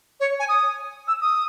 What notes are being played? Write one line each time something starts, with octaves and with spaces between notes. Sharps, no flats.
C#5
G#5
D#6
E6
D#6